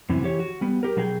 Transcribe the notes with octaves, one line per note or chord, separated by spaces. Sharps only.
F#2 C3 E3
E3 G4 C#5
F#4
G3 B3
G4 A#4
B2 F#3 D4 G#4 G5